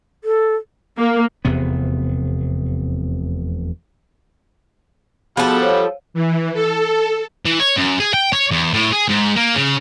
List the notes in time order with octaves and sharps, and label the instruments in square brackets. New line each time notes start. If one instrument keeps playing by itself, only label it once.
[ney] A4
[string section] A#3
[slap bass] F1 E2 C3 B3
[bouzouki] F3 A4 [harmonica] G3 F#5 [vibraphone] B3 F#4 G#4
[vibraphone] C5 C#5 F5
[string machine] E3
A4
[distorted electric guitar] E3
C#5
F#2
G#4
G5
C#5
E2
A2
G#4
G#2
A#3
C#3